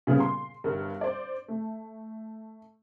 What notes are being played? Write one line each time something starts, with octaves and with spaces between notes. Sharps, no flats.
A#2 C#3 G3 B3
C6
G1 G2 G3 A#4
C5 D5
A3